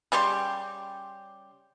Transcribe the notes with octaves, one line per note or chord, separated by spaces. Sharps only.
C#3 G3 G4 C6